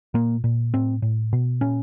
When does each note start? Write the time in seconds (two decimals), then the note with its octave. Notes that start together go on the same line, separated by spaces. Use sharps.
0.14 A#2 A#3
0.44 A#2
0.74 A2 C4
1.02 A2
1.33 B2
1.61 A#2 C#4